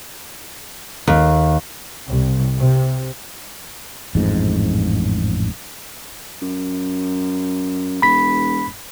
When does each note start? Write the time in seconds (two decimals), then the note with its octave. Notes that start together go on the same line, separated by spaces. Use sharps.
1.08 D#2
2.09 C2
2.57 C3
4.15 A1 F2 G#2
6.42 F#2
8.02 E1 B5 B6